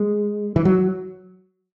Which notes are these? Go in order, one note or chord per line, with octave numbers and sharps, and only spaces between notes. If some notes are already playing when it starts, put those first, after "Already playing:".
Already playing: G#3
E3
F#3